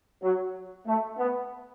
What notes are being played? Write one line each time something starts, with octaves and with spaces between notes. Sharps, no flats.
F#3
A3
B3